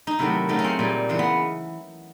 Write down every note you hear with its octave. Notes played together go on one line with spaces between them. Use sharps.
D#4
C3 D#3 F#3 A3 E4
C#3 F#3 A3 D#4
C#4
C4
A#2 G3
C#3 E3 G#3
B3